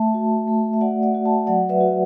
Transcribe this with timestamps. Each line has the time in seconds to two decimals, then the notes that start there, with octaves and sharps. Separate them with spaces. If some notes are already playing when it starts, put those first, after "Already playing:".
Already playing: A3 E5 A5
0.14 F#4
0.48 A3
0.73 E5
0.81 F#4 D5 F#5
1.03 D5 F#5
1.14 F#4
1.25 E5 A5
1.47 F#3 D5 F#5
1.69 B4 E5
1.81 F#4